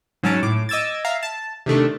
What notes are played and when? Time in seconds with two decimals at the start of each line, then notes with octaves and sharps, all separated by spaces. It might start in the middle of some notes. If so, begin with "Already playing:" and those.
0.23 G#2 F#3 C#4 A5 D7
0.43 A2 D6
0.69 D#5 D6 E6 G#6 A6
1.05 E5 F5 A#5
1.23 A5
1.66 C3 D#3 A3 D4